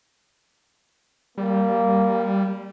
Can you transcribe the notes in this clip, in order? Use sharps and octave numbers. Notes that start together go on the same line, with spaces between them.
G3 A#3